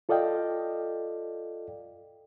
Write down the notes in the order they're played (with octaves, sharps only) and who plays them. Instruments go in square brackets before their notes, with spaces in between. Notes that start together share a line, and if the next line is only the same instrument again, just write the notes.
[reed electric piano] F4 A4 D5 D#5 F5 G5